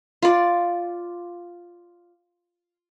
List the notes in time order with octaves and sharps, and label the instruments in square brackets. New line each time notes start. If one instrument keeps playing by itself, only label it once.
[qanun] F4 D5